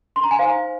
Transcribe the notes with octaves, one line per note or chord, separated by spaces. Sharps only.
C6
A#5
G#5
D#4 C5 F5